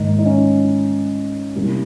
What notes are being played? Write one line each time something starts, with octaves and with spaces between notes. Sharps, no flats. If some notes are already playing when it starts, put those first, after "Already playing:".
Already playing: G#1 G#2 D#3 A#3 D#4
D#4
C#4
C2 C3 G3 A#3